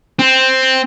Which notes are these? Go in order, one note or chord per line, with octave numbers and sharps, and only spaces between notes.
C4